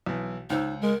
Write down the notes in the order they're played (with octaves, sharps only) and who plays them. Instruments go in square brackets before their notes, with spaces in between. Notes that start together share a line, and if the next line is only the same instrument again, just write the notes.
[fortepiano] B1 E3
[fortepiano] C#2 C5 E6 [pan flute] D#4
[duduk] G#3 [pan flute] A#4